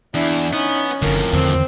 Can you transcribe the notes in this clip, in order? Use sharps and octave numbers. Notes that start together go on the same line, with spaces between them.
E2 D4 E4
B3 C#4 D#4
F#1 F2 A2 D3 A#4
E2 D3 D#3 C4